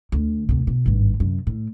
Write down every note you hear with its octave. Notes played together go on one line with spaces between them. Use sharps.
D2
D2 C3
B2
G#1 G2
F#2 C3
A2